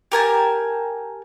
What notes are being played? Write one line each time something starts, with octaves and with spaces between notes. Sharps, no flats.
G4 A#4 G#5 A5